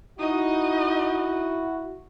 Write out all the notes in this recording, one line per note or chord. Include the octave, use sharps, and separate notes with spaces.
D#4 E4 F#4 D#5